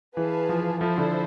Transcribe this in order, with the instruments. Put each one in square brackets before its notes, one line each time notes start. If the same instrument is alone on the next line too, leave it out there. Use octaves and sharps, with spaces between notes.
[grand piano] E3 [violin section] G#4 B4 F5 A5
[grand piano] F3
[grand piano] F3 [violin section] E4 A4 C5
[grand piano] D3